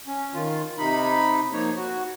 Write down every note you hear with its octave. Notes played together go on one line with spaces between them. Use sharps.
C#4
D#3 F4
C3 D#4 B5
F3 A#3 D#4 C#5
F#4